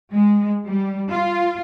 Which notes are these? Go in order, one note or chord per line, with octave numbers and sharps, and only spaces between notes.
G#3
G3
F4